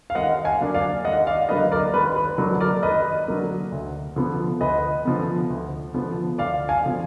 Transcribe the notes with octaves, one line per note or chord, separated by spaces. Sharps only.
F5
D#2 D#5 F#5
F5 G#5
D3 F#3 A#3 D4
D5 F5
D#2 D#5 F#5
D5 F5
D3 F#3 A#3 D4 B4 D#5
A#4 D5
D#2 B4
B4
D3 F#3 A#3 D4
A#4 D5
D#2 B4 D#5
D3 F#3 A#3 D4
D2
D3 F3 B3
D2 B4 D#5
D3 F3 B3
D2
D3 F3 B3
D2 D5 F5
F5 G#5
D3 F3 B3